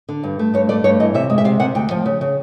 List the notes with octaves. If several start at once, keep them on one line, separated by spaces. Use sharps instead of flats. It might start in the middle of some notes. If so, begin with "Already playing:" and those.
D3
G2
A3
G2 C#5
A3 D5
G2 C#5
E3 D#5
C3 E5
G#3
E5
C3 F5
C3 F#5
D2 G5
F3
C#3
C#3